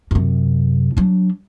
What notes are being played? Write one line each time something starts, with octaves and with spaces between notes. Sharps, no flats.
F#2 C3
F#3 D4